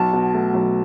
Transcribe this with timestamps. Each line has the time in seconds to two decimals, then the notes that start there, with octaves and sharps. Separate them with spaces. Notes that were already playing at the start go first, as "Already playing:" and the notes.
Already playing: B1 A5
0.13 B2
0.34 A3
0.54 B1